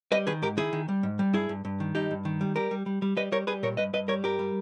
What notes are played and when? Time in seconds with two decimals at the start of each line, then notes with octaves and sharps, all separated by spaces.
0.12 G3 B4 D#5
0.27 D#3 G#4 B4
0.42 G#2 G4 A#4
0.57 D#3 E4 G#4
0.73 D#3
0.89 G3
1.03 G#2
1.19 G3
1.33 G2 E4 G#4
1.49 G2
1.65 G2
1.80 D#3
1.95 G2 D#4 G4
2.11 G2
2.25 D#3
2.41 G3
2.56 G3 G4 A#4
2.71 G3
2.86 G3
3.02 G3
3.17 G3 B4 D#5
3.32 G3 A#4 C#5
3.47 G3 G#4 B4
3.63 A#2 A#4 C#5
3.77 G2 B4 D#5
3.93 G2 B4 D#5
4.08 G3 A#4 C#5
4.24 G2 G4 A#4
4.39 G3